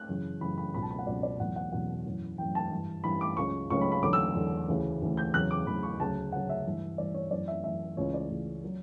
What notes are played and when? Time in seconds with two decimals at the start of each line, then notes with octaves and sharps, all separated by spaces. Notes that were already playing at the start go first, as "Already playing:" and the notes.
Already playing: F#6
0.09 F#2 C#3 E3
0.41 F#2 C#3 E3 B5
0.58 B5
0.74 C#2 B2 F#3 B5
0.82 A5
0.91 B5
0.99 F#5
1.07 C#2 B2 F#3 D5
1.23 D5
1.40 E2 B2 F#3 F#5
1.56 F#5
1.72 E2 B2 F#3 F#5
2.06 F#2 E3
2.38 F#2 E3 G5
2.55 A5
2.71 G2 E3
3.04 G2 E3 B5
3.21 D6
3.37 C#2 C#3 F#3 C#6
3.70 C#2 C#3 F#3 C#6
3.81 B5
3.92 B5
4.03 E2 D3 F#3 D6
4.13 E6
4.35 E2 D3 F#3
4.68 D2 C#3 E3
5.02 D2 C#3 E3
5.17 G6
5.34 E2 C#3 F#3 F#6
5.51 D6
5.67 E2 C#3 F#3 B5
5.83 C#6
6.00 D2 C#3 F#3 A5
6.32 D2 C#3 F#3 F#5
6.50 E5
6.65 G2 E3
6.98 G2 E3 D5
7.14 C#5
7.31 F#2 E3 D5
7.48 E5
7.64 F#2 E3 E5
7.97 C#2 C#3 E3 C#5
8.14 D5
8.30 C#2 C#3 E3
8.64 F#3